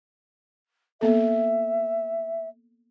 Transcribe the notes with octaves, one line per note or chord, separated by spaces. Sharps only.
A#3 B3 A4 E5